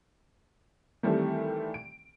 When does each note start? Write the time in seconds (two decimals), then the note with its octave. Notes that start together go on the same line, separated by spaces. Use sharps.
1.03 D#3 E3 G3 A3 C4 A4
1.74 D7